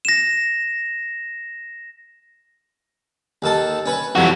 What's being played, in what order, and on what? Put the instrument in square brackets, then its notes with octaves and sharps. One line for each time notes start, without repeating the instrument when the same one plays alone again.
[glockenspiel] A#6 E7
[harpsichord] D#2 D#3 A4
C#4 B4
[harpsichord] F2 C3 [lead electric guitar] E3 F#4